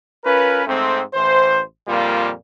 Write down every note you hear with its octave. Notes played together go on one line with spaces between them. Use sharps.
C#4 F4 A#4 B4
G#2 A3 C4
A1 E3 C5
F2 A#2 G3 A#3 F4